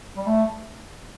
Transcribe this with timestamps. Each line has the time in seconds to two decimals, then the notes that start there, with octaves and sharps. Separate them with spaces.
0.17 G3
0.27 A3